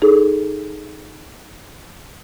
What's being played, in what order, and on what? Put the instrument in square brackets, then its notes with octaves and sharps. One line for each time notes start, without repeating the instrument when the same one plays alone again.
[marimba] D#4 G#4 A4